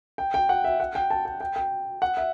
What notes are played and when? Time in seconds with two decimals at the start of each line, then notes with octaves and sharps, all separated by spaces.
0.18 G5
0.34 G5
0.49 F#5
0.64 E5
0.80 F#5
0.95 G5
1.10 A5
1.25 G5
1.41 G5
1.56 G5
2.02 F#5
2.17 E5